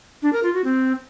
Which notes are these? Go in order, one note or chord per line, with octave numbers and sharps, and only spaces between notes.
D4
A#4
F4
F#4
C4